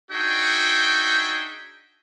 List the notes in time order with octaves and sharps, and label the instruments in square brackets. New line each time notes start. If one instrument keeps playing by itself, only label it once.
[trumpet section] D4 D#4 F#4 G#4 E5 G5